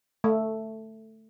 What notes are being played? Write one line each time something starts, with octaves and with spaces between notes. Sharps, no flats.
A3